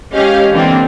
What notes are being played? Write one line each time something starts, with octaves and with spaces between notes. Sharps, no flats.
G#3 C#4 G4 D#5 F5
D3 E3 A#3 C4 D4